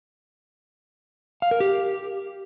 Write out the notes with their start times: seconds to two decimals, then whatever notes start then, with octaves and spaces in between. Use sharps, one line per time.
1.42 F5
1.51 A#4
1.60 G4